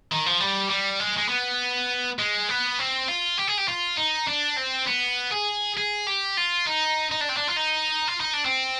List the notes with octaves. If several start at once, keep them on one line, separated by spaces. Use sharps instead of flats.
D#3
F3
G3
G3
G#3
G#3
B3
G#3
B3
C4
F4
G4
G#4
G4
F4
D#4
D4
C4
B3
G#4
G#4
G4
F4
D#4
D#4
D4
C4
D4
F4
D#4
F4
D#4
D4
C4